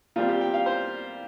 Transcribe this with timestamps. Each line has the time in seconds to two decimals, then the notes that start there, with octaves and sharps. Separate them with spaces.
0.16 A#2 G3 C4 F4
0.28 G4
0.41 G5
0.54 F5
0.66 C5